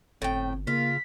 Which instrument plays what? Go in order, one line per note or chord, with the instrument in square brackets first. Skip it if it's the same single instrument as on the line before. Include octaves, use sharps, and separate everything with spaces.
[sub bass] G1 [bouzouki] A2 G5 [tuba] C4
[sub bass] C#3 [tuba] A#3 [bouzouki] F4 [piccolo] B6